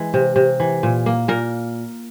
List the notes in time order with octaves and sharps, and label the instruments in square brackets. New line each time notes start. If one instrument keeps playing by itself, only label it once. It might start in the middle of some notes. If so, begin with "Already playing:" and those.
Already playing: [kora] E3 G#3
C3
C3
E3
A#2
A#3
A#2 A#4